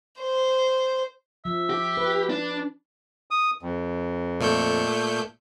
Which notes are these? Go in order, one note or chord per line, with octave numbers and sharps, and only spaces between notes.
C5
F3 E5
G4
B4
D4
D#6
F2
A#2 A3 G6